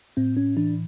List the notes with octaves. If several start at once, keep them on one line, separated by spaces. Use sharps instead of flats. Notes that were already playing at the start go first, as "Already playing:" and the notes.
A2 C4
C#4
E3 D4